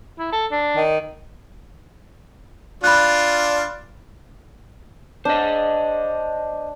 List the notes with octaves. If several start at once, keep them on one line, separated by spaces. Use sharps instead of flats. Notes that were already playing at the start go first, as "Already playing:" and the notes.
E4
A4
D4
D#3
D4 F4 B5 F#6
D4 C5 D#5